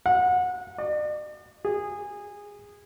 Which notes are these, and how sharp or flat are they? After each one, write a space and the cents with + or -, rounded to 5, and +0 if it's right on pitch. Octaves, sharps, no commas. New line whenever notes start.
F#5 -25
D5 +45
G#4 -20